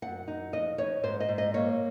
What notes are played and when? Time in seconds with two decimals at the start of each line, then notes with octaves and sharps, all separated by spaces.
0.02 F#2 F#5
0.28 D#4
0.53 F2 D#5
0.78 F2 C#5
1.03 G#2 C5
1.20 D#5
1.29 G#2
1.38 D#5
1.54 A#3 C#5